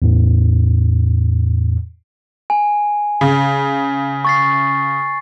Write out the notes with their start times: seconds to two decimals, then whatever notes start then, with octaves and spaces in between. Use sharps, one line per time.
0.02 E2 A2
2.50 G#5
3.21 C#3
4.25 C#6 A6 C7